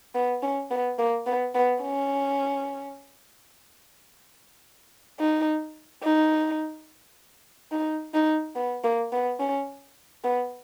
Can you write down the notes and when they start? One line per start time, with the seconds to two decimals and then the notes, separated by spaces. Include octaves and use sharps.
0.15 B3
0.43 C#4
0.71 B3
0.98 A#3
1.26 B3
1.55 B3
1.82 C#4
5.20 D#4
6.03 D#4
7.72 D#4
8.14 D#4
8.56 B3
8.84 A#3
9.12 B3
9.40 C#4
10.24 B3